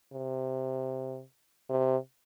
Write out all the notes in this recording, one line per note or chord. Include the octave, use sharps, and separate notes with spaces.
C3
C3